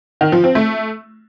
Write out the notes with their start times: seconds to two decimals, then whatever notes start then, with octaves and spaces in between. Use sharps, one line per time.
0.21 D#3
0.32 F3
0.44 C4
0.55 A3